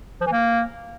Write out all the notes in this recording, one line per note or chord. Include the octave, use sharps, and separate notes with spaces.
F3
E3
A#3